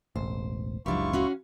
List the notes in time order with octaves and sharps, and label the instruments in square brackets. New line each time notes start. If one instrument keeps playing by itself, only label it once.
[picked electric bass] E1 A1 [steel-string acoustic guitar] C5
[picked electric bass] F#1 C#2 [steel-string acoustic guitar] F#3 D4 G4 [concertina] E4 F4 C#6
[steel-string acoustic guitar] C#4 F#4 F5